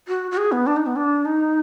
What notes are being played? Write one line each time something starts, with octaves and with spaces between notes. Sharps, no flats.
F#4
F#4
G#4
B3
D4
D#4
B3
D4
D#4